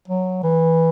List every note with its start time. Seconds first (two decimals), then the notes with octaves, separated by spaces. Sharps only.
0.08 F#3
0.44 E3